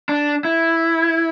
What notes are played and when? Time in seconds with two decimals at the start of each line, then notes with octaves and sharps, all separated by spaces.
0.09 D4
0.45 E4